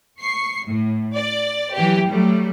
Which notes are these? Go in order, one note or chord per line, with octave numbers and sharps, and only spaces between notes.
C#6 C7
A2
D5
E3 F#3 G4
F#3 G3 A3